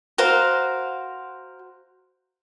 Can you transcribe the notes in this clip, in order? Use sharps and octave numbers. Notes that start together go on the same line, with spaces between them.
F#4 A#4 C5 F5